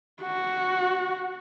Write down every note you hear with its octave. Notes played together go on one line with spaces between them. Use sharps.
F#4